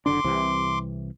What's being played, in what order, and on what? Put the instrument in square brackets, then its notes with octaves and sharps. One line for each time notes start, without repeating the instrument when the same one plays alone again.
[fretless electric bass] F#1 D3 D4 [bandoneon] C6 D6
[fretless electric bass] C2 C3 E3